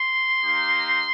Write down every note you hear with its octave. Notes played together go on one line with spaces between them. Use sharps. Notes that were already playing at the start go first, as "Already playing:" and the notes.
Already playing: C6
A#3 D#4 G4